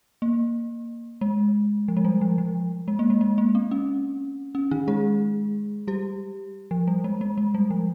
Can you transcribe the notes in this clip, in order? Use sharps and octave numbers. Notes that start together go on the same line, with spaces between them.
A#3
G#3
F3
G#3
G3
F3
F3
G#3
A#3
G#3
G#3
A#3
C4
C#4
C#4
D#3 D#4
G#3 G#4
G3 G4
F3
G3
G#3
G#3
G#3
G3
F3